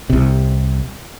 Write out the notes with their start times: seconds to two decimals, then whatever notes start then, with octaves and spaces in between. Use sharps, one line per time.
0.10 C2 C3